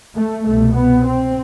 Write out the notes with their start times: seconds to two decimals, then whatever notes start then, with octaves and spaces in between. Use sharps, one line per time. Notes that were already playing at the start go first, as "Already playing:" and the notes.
0.16 A3
0.46 C2 B2 A3
0.76 B3
1.06 C4